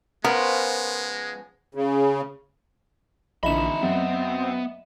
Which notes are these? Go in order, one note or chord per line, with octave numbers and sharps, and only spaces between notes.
C#3 F3 G#3 B3 A#4
C#3
A#1 D3 E3 D#4 D#5 E5 B5 E7
F#2 B3 C4